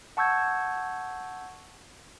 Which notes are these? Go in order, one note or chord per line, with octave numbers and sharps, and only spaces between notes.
F#5 A5 C#6 E6 G6 G#6